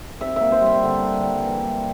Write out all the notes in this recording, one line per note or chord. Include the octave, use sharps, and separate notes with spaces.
C3 E5
A#3 E5
C5
G3 E5
D3
D4
G3
E3
D4